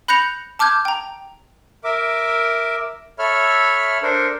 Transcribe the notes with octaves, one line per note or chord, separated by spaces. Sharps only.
B5 F#6 G6 A#6 C#7 F7
A5 D6 F6 G6 G#6
G5 A#5
A#4 E5 D6
A4 C#5 E5 B5 F6
D4 A4 A#4 C5